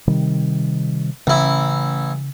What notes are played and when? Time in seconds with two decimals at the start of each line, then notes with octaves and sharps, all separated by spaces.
0.07 C3 D#3 G3
1.27 A1 C#3 E4